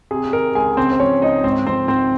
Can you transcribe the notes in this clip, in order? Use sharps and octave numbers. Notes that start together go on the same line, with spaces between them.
C3 G#4
D#3 A#4
C#2 G#4 G#5
C#3 C4 C5
C5
F3 C#4 C#5
C#2 D#4 D#5
G#2 C4 C5
F3 C4 C5
G#1 C4 C5